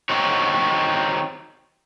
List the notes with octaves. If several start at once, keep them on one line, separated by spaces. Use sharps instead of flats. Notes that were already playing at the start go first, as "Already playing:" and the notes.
C4 D#4 F#4 G4 C#5